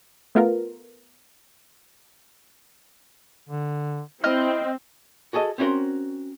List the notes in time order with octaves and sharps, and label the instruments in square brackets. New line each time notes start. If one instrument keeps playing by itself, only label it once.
[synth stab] A3 B3 F4 A#4
[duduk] D3
[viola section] C4 [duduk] E4 [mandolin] D#5 F6
[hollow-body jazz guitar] F#4 G#4 A4 D#5
C4 C#4 E4 F#4 A#4 C6